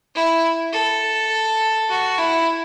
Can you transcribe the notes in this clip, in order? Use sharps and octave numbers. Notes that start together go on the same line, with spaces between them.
E4
A4
F#4
E4